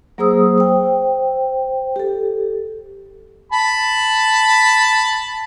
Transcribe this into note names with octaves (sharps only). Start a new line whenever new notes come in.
F#3 A#3 G#4 C5 D#6 E6
C5 G5
G4 A4
A5 B5